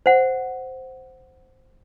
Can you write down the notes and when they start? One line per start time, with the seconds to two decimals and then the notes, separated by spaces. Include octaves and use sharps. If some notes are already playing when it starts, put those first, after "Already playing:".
0.06 C5 F#5